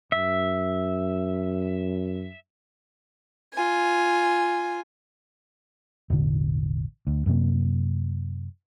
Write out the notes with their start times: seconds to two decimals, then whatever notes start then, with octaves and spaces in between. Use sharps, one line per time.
0.12 F#2 E5
3.53 F4 G#5
6.10 E1 A1 D3
7.07 D2
7.26 F#2 C3 A#3